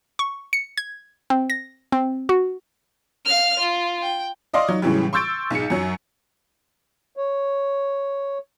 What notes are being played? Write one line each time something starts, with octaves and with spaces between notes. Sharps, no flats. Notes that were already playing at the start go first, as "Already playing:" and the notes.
C#6
C#7
G#6
C4
A#6
C4
F#4
F5 F6
F4
G5
D5 D#5 F5 C6 D6 D#6
F#3 D#4
A2 C#3 E3 F#3 G3
C6 C#6 E6 G6 A6 D7
B1 G#2 G#4 C#7
F#2 F#3
C#5